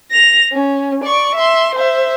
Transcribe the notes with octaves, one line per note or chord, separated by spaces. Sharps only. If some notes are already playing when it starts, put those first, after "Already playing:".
A#6 F7
C#4
D5 C#6
E5 C6
C5 E5